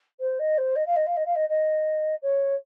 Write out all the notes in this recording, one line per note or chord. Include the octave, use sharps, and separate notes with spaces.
C5
D#5
C5
D#5
F5
D#5
F5
D#5
F5
D#5
D#5
C#5